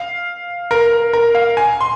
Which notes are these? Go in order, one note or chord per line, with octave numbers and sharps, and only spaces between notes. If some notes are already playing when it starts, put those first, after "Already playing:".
Already playing: F5
A#4
A#4
A#4
F5
G#5
C6